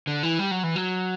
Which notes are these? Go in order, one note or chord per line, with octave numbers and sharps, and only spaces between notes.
D3
E3
G3
F#3
E3
F#3